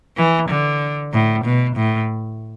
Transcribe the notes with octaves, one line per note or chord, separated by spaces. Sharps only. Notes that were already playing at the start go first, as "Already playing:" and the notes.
E3
D3
A2
B2
A2